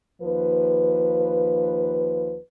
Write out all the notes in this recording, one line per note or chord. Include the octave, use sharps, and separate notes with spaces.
D#2 F3 B4